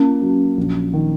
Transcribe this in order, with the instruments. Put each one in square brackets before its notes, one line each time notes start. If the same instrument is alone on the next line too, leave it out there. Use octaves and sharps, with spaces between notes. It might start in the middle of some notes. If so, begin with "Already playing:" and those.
Already playing: [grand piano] A#3 [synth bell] C#4
[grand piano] F#3
A#1
D#3